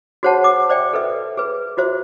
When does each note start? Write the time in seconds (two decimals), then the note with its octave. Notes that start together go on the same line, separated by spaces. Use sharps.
0.23 F#4 G#4 C5 C#5 F#5 A5
0.44 D6
0.70 C5 D5 E5 G5
0.93 A4 B4 E5
1.37 G#4 B4
1.77 F4 F#4 C5 E5